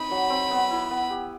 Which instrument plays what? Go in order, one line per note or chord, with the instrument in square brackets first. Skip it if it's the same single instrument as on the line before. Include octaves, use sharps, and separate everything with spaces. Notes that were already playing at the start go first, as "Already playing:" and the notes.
Already playing: [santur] C4 D#4 [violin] B5
[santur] F#3
C4
B3
E4
B3
G4